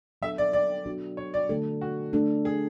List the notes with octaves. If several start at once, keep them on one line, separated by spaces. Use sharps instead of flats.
F#3 B3 D4 A4 E5
D5
D5
F#3 B3 D4 F#4
C#5
D5
D3 A3 D4 A4
F#4
A3 D4 A4
G#4